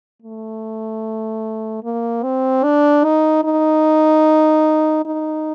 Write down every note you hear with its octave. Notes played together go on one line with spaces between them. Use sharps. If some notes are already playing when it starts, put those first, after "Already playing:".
A3
A#3
C4
D4
D#4
D#4
D#4